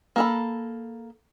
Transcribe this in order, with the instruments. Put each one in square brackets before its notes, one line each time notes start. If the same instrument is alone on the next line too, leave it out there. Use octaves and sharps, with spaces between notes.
[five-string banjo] A#3 A4 B5